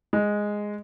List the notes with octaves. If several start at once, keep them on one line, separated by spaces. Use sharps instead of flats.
G#3